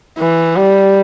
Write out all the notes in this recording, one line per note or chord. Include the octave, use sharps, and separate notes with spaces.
E3
G3